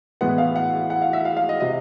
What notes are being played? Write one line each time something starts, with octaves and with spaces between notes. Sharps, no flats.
A2 E3 G#3 B3 F#5
F5
F#5
F#5
F5
E5
F5
F5
D#5
C3 D#5